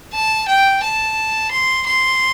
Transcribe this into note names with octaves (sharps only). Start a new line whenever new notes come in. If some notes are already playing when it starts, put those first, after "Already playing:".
A5
G5
A5
C6
C6